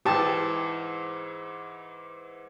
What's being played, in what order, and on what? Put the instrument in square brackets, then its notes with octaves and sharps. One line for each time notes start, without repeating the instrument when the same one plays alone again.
[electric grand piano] G#2 E3 [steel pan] G4 A5